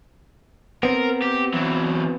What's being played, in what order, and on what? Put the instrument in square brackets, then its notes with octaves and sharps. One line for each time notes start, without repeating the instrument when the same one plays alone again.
[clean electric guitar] B3 C4 [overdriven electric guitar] A#4
[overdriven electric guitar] G4
E3 F#3